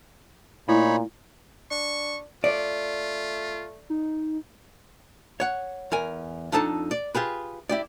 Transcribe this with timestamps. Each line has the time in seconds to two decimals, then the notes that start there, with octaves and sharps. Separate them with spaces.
0.69 A#2 A3 D#4 E4 C#5 B5
1.71 D4 C#6
2.44 A3 F4 D5
3.90 D#4
5.40 C#5 F#5
5.92 E2 A#4 G#5
6.52 F2 D4 D#4 A4 A5
6.91 D5
7.15 F4 G4 G#4 B4
7.69 E4 G4 D5